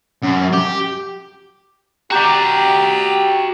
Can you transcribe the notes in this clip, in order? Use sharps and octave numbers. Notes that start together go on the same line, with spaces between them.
F#2
G4
F#4 G4 D5 G5 A#5 G6